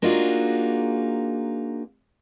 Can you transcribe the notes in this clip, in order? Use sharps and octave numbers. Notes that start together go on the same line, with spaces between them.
A#3 D4 D#4 F4 F#4 G#4